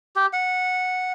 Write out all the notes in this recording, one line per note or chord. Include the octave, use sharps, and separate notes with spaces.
G4
F#5